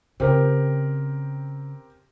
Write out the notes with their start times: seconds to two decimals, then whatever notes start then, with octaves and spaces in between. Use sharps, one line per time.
0.20 C#3 C4 G4 A#4